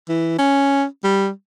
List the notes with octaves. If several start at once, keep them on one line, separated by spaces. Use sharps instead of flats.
E3
C#4
G3